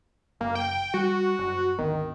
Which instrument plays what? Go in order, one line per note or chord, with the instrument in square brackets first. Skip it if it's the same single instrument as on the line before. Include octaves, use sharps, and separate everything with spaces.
[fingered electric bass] F#1 [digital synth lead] A#3
[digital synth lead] G5
[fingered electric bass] G3 [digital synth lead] F#4
[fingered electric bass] F#1
[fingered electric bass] G#1 D2 B3 [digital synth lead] D#3